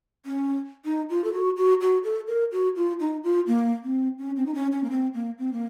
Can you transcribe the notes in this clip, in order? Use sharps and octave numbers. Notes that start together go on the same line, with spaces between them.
C#4
D#4
F4
A4
F#4
F#4
F#4
A4
A#4
F#4
F4
D#4
F4
A#3
C4
C#4
C4
D#4
C#4
C#4
A#3
C4
A#3
C4
A#3